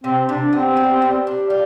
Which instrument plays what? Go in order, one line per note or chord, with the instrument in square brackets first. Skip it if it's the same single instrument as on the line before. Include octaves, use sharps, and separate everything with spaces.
[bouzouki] C3 [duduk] C4
[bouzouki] C3 [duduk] D4
[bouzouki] B3 [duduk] C4
[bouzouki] G3
G3
D4
F4